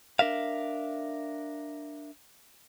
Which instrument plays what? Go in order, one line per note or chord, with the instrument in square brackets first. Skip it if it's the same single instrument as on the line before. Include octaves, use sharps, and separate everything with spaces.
[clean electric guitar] D4 A#4 E5 F5